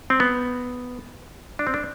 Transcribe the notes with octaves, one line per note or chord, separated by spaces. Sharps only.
C4
B3
D4
C4
D4